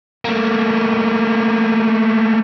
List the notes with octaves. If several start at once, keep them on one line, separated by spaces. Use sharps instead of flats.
A3 A#3